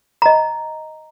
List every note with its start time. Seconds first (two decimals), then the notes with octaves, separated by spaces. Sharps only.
0.22 D#5 A#5